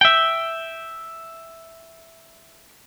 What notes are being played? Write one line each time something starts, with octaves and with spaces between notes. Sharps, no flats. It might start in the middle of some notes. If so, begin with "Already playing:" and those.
E5 G5